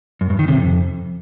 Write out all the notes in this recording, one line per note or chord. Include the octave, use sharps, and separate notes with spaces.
F#2
G2
D#3
C3
F2